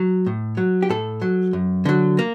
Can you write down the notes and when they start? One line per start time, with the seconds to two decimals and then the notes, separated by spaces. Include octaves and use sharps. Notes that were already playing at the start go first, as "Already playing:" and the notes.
Already playing: F#3
0.27 A2
0.57 F#3
0.82 G4
0.89 A2 A4
1.22 F#3
1.53 F#2
1.85 D3 F#3
2.19 A#3